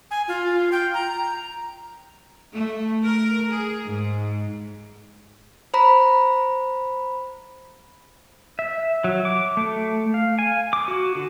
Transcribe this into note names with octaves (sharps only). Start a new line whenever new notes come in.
G#5
F4
G5
A#5
A3
A#4
G#4
G#2
C5 A#5 B5
E5
F#3
D6
A3
F5
G#5
D6
F#4
D3